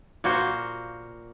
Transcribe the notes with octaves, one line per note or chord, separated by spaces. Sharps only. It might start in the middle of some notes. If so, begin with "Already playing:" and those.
A#2 A#3 F#4 C5